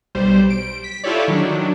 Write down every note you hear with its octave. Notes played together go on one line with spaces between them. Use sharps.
B1 G3 C5
D7
B6
E4 F4 G4 A4 C#5 D5
D#3 F#3 D4